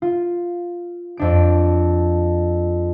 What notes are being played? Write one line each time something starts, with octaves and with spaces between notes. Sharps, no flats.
F4
F2 D4 D7